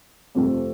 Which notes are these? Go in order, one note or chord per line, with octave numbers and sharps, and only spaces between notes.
F2 C3 F3 A3 C4